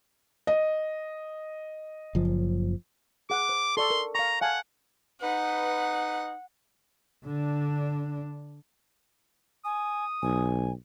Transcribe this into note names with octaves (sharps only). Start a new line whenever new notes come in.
D#5
F#1 F3
G#4 F#5 D6
C5
A4 D5 C6 C#6
A#4
F5 A#5 C#6
F5 F#5 G#5 A5
D#4 B4 F#5
D3 D4
G#5 D#6
B1 G#5